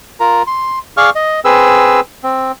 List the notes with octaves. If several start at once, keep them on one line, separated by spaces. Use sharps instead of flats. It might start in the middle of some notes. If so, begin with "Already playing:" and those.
F4 A#4 A#5
C6
G#4 D5 F5 C#6 F6
D#5
C4 G#4 B4 E6
C4